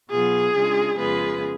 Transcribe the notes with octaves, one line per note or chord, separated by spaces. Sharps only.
B2 F#3 B3 F4 G#4
C#3 G#3 D4 F4
F2 C#3 G#3 B3 F4 G#4 B4